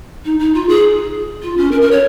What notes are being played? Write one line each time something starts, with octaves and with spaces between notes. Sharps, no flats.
D#4
D#4
F4
G#4
F4
C#4
A#4
A#4
C#5